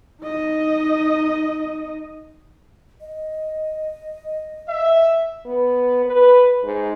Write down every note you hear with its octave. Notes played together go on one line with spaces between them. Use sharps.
D#4 D#5
D#5
E5
B3
B4
G#2